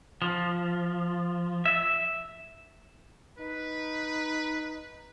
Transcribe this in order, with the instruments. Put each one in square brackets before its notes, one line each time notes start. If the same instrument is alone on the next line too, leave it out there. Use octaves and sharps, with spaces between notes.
[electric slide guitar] F3
E5
[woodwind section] D#4 [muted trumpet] B4